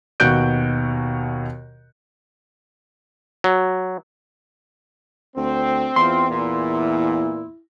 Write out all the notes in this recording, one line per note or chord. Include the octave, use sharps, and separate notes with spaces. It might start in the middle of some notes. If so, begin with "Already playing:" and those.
D#2 B2 F#4 F#6 G6 D7
F#3
D2 C4
E2 F4 C6
A#2 E4